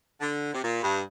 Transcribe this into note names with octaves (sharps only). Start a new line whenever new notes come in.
D3
C3
A#2
G2